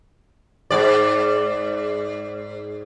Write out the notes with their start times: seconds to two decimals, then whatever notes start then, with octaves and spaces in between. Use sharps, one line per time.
0.71 G#2 D5